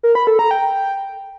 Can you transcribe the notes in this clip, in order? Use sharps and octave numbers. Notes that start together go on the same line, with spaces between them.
A#4
B5
A4
A#5
G5